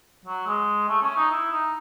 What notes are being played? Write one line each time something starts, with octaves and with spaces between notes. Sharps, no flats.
F#3
G#3
A3
C#4
D#4
E4
D#4